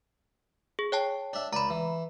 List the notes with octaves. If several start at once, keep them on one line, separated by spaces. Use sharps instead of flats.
G#4
C#5 G5 A5
D4 E5
C#2 D5 A#5 B5
E3